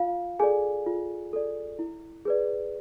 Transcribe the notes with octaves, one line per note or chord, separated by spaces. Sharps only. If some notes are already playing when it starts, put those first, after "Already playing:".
Already playing: F4 F5
G#4 A4 D5 G#5
F4
A4 D5
E4
G#4 B4 D5